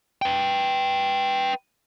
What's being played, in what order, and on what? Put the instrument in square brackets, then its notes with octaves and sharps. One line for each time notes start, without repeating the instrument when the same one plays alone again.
[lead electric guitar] B4 G5